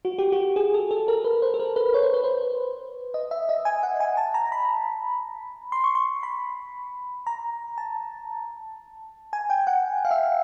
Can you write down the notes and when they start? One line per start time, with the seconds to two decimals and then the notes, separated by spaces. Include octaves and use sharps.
0.05 F#4
0.19 G4
0.32 F#4
0.56 G#4
0.74 A4
0.91 A4
1.08 A#4
1.24 B4
1.42 C5
1.54 A4
1.60 A#4
1.76 B4
1.94 C#5
2.03 C5
2.14 B4
2.24 C5
3.14 D#5
3.31 E5
3.49 D#5
3.65 G#5
3.83 F#5
4.00 G#5
4.17 A5
4.34 A#5
4.52 B5
5.72 C6
5.84 C#6
5.95 C6
6.23 B5
7.27 A#5
7.78 A5
9.33 G#5
9.50 G5
9.67 F#5
10.05 F5
10.11 E5